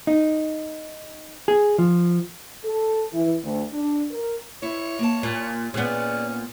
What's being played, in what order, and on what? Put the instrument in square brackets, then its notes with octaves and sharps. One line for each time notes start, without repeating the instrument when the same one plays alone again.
[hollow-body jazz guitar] D#4
G#4
F3
[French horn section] A4
E3
D2
D4
A#4
[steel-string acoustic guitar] E4 [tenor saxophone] C#5
[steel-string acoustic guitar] A#3 A5
[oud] A#2
[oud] A#2 B3 [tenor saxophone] C#4 [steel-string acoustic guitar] G#4 C5 D5